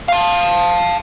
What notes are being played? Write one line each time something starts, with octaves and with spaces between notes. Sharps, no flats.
F5 A5